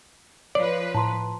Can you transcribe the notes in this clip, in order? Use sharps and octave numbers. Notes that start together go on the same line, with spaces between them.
F3 B4 C#5 D5
A2 A5 A#5 C6